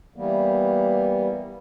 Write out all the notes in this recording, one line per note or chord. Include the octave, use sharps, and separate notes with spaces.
E3 G3 A#3 B3